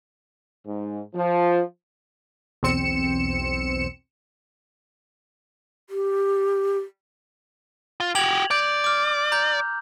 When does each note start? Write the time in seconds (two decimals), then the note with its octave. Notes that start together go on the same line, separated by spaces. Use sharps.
0.66 G#2
1.14 F3
2.63 B1 E2 C4 C#7 E7
5.88 G4
8.00 F4
8.15 F#4 G4 G#6 F7 F#7
8.51 D5 G6
8.84 D6 F6
9.32 A#5 G6